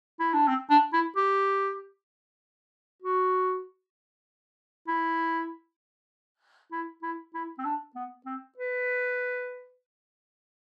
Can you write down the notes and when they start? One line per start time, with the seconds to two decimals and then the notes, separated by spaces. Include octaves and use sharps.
0.20 E4
0.33 D4
0.47 C4
0.70 D4
0.93 E4
1.16 G4
3.02 F#4
4.87 E4
6.72 E4
7.03 E4
7.34 E4
7.59 C4
7.65 D4
7.95 B3
8.26 C4
8.57 B4